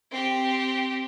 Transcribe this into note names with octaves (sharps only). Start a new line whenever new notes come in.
C4 G4